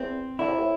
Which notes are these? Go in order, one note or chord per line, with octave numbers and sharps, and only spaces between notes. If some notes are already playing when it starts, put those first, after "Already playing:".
Already playing: E2 C4
D3 E4
C3
A2